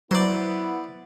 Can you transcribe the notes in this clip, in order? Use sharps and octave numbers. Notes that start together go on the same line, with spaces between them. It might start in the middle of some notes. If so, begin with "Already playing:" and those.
F#3 B3 E4 C5 D5